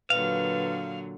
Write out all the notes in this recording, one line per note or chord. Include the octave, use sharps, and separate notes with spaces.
A#2 D3 F#3 B4 F5